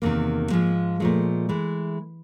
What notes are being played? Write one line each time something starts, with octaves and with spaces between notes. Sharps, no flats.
E2 C3 D#3 A#3
G#2 F3 G#3
A#2 F3 G#3 A3
E3 G#3